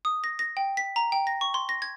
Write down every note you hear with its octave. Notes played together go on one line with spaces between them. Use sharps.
D#6
A#6
A#6
G5
B6
A#5
G5
A#6
C#6
C6
A#6
G#6